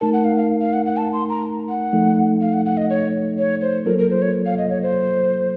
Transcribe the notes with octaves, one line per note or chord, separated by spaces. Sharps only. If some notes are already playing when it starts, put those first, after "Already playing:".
A3 D#4 A#4 A5
F#5
F5
F5
F5
F#5
F#5
A5
C6
A#5
F#5
F3 A3 D#4 A4
F5
F#5
F#5
D#5
C#5
C#5
C5
F#3 A#3 F4 A4 A#4
A#4
C5
C#5
F5
D#5
C#5
C5